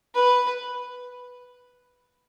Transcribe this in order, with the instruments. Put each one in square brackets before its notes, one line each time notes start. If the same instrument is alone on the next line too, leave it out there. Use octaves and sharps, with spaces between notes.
[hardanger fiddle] B4